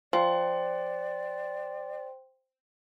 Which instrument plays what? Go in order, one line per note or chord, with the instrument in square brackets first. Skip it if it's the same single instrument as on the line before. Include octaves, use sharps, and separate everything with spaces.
[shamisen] F3 [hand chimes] C5 G5 C6 [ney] D5